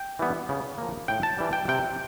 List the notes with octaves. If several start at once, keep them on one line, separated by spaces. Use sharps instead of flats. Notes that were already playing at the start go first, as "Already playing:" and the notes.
Already playing: G5
E3 G3 B3
C#3
F3 A#3
A2 G5
A5
E3 G3
G5
C3 G5